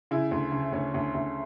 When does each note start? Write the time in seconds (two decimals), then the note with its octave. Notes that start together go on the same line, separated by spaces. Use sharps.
0.11 C#3 E4
0.31 D2
0.52 C#3
0.72 D2 C#4
0.94 D2
1.15 D2